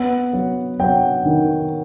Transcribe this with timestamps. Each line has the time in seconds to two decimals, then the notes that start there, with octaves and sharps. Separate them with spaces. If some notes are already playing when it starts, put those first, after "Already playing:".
Already playing: B3 F#5
0.33 F#3
0.79 F#3 G5
1.25 D#3